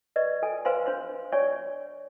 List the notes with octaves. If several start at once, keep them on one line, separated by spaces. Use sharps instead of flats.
B4 D5 D#5 C#6
A4 G#5
B4 C5 F5 G#5 C6
D4 C5 C6
C#5 D5 G#5 C#6